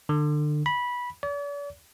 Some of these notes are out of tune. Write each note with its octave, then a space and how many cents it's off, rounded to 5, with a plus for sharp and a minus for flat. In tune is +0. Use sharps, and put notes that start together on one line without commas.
D3 +30
B5 -15
D5 -45